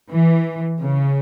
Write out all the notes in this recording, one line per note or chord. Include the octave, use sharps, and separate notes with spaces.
E3
C#3